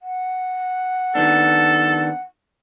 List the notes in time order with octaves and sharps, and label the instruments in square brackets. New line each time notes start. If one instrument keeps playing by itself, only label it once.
[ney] F#5
[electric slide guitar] D#3 B3 D4 [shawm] A4